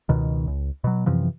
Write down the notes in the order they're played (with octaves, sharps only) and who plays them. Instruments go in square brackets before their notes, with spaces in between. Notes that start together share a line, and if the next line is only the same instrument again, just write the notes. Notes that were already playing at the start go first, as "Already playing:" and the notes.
[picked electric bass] C#2 B2 D#3
C#2
B2 F#3
F#2 C3 E3 F3